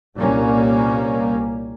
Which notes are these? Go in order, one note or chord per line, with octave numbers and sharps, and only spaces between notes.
C2 A#2 G3 A#3 C#4